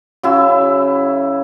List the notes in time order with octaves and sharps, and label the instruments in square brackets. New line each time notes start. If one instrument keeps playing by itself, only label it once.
[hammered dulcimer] C#3 [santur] F#3 E4 E6